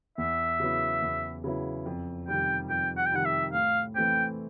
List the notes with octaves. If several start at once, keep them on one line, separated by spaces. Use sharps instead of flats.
E2 E5
C#3 F#3 B3 E4
E2
C#3 F#3 B3 E4
F2
C3 D#3 G3 G5
F2 G5
F#5
G5
C3 D#3 G3 F#5
E5
A2 F5
E3 A3 C4 G5